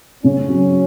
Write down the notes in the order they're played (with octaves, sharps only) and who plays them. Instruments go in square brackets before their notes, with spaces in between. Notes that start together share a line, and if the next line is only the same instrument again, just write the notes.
[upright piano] C#3 [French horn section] C#4
[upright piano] F#3